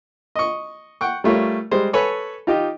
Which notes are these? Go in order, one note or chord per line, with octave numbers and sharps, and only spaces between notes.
D#5 C#6
F#5 G5 C#6
G3 A3 F4 A#4 C#5
G3 G#3 C5
A4 B4 C#5 G#5 B5 C#6
D#4 F4 G4 D#5